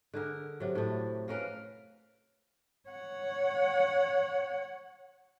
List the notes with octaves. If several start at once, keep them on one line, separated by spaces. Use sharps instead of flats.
D3 G#4 A#4
C3 F#3
A2 A3
A#3 C#4 A#4 B4
C#5 F#5